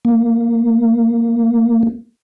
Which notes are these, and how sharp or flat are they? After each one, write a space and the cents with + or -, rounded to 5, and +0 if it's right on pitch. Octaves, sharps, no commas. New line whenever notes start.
A#3 -5